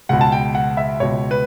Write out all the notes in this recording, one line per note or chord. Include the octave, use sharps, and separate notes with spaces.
C#2 B2 F#5
A5
G5
F#5
E5
C#2 B2 C#5
B4